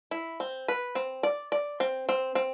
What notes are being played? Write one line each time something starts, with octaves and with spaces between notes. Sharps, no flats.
E4
C4
B4
C4
D5
D5
C4
C4
C4